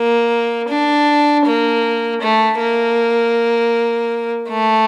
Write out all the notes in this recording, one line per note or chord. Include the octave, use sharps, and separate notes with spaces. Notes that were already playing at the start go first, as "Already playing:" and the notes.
Already playing: A#3
D4
A#3
A3
A#3
A3